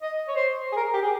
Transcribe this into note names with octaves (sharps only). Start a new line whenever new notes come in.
D#5
C#5
C5
G#4
A#4
G4
G#4